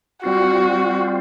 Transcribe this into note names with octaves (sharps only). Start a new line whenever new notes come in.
G3 C4 F4 F#4